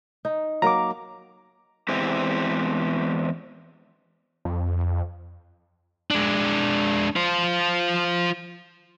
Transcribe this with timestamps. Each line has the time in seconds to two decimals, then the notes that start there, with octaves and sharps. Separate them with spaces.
0.25 D#4
0.62 F#3 A#3 A#5 D6
1.88 E2 G#3 C4 E4 G4
4.45 F2
6.11 G#3 D4
7.16 F4 C5